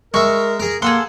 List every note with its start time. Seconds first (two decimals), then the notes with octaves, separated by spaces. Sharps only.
0.14 G#3 A#4 E5 C#6
0.59 G#4 A#4
0.82 A#3 G#4 A4 F#5 C6